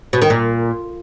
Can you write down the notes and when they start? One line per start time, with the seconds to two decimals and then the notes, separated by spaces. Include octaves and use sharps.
0.13 B2
0.22 D#3
0.30 A#2